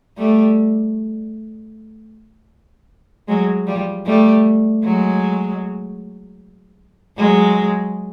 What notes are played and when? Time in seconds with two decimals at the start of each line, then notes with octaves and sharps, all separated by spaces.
0.18 G3 A3
3.28 F#3 G#3
3.67 F3 G3
4.06 G3 A3
4.84 F#3 G#3
7.17 F#3 G#3